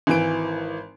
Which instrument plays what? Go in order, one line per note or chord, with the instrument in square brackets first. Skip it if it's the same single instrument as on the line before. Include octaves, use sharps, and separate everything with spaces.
[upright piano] G#1 E3 D7